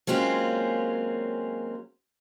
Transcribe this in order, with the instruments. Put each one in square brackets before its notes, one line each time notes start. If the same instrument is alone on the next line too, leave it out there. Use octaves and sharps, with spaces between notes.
[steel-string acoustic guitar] F#3 G#3 A#3 C4 C#4 F4